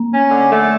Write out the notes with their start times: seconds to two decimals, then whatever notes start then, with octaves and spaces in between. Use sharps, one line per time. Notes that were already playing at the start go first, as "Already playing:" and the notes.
Already playing: A#3
0.11 C#4
0.30 D3
0.50 A3